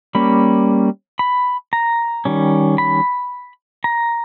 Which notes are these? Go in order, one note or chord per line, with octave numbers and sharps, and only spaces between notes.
G3 A#3 C#4 B5
B5
A#5
D#3 G3 C#4
B5
A#5